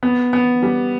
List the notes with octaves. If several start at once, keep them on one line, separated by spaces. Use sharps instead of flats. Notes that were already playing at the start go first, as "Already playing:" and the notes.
B3
B3
G3